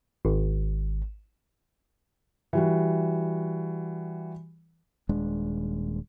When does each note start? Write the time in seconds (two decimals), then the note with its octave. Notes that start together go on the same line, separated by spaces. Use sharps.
0.25 G#1
2.53 E3 G3 F#4
5.09 D#1 G#3 D4